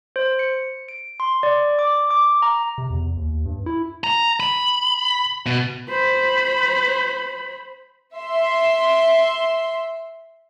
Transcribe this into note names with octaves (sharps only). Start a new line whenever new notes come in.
C5
C#7
D7
C6
D5
D6
D6
A#5
C3
E2
D#2
G2
E4
A#5
B5
B2
C5 B5
E5 C6